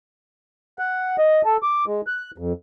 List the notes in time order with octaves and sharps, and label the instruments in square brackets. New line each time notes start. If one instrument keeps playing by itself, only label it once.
[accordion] F#5
D#5
A4
D6
G#3
F#6
F2